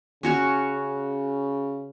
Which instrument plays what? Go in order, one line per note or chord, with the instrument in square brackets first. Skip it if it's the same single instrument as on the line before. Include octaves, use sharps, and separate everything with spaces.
[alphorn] C#3 [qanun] C#4 F#4 C#5